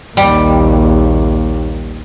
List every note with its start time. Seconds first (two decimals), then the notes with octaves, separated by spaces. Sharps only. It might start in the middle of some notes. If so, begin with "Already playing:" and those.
0.17 A#1 D#2 G3